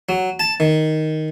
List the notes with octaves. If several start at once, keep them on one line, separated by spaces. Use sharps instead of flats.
F#3
A5
D#3